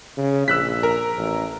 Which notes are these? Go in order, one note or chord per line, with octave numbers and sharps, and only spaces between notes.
C#3
A#1 E6 F#6 B6
A#4
A1